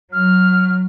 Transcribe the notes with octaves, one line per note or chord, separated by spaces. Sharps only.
F#3 F6